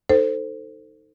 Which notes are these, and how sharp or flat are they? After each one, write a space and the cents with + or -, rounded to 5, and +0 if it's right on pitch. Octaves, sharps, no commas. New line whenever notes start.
D#4 +0 A4 +20 C5 +0